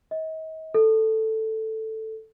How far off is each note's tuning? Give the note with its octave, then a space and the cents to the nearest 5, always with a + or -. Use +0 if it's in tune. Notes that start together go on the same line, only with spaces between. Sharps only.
D#5 +40
A4 +5